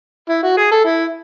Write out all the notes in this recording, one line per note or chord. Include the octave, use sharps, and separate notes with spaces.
E4
F#4
G#4
A4
E4